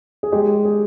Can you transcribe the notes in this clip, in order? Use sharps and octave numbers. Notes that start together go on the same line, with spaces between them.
G#4
G#3 G4
G#4